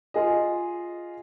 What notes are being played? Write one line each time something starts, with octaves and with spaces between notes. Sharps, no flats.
F4 G#4 D#5